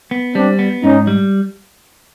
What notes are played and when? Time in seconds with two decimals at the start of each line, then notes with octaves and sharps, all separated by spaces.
0.11 B3
0.35 G3 C4 D4
0.59 B3
0.83 G#2 C#4 D#4
1.07 G3